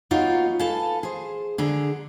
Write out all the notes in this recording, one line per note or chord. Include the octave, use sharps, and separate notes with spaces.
F#3 A#3 B3 D#4 F4 C#5
A4 B4 F5 G#5 A5
G#4 C5
D3 G#4 A#5